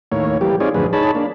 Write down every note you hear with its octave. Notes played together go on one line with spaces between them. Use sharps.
D#2 A2 A#3 C#5
E3 G3 A#3 G4
C4 D#4 F4 G#4 C#5 D5
F#2 A2 D3 F3 G#4 B4
D#4 G#4 C#5 A5 B5
A#3 D4